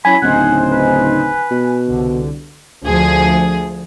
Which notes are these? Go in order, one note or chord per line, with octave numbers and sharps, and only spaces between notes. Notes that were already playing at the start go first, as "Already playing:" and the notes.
F#3 C#4 E4 G#5 B5
D1 C#3 D#4 C5 F#5
B4
B2
C2 D3
D2 F3 G#4